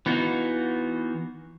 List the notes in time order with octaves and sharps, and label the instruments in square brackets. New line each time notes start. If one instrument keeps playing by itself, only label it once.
[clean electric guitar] E3 B3 D#4 F4 F#4